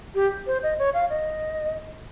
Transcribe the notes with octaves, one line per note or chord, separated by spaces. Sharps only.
G4
C5
D#5
C#5
F5
D#5